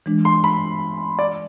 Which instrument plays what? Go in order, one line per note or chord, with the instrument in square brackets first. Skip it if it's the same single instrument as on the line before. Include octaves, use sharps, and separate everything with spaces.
[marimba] E3 G#3 D4
[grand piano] C6
B5
D5